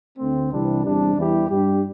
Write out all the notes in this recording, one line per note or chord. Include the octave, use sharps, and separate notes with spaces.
D2 D3 A3 C4
C2 C3 E3 G3 D4
E2 C3 G3 D4
E2 E3 G3 E4 G4
G2 G3 D4 G4